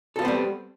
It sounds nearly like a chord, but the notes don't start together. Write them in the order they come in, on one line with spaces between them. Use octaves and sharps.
A4 F4 B3 C4 G3